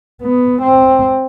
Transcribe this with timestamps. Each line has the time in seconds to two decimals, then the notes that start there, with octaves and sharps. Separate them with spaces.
0.22 B3
0.62 C4